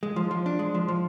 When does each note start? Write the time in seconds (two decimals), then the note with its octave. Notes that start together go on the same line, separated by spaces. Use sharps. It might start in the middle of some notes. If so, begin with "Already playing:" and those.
0.03 G#3
0.16 F3
0.31 F3
0.46 D4
0.59 G#3
0.74 F3
0.88 F3